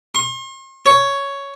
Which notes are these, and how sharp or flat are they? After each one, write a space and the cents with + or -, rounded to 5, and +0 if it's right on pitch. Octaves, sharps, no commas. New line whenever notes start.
C6 +45
C#5 +5